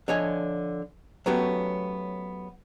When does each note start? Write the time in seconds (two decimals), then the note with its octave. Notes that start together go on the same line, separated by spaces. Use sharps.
0.08 D3 F3 C#5 D#5 G#5
1.26 F#3 A3 B3 C#4 F#4 G4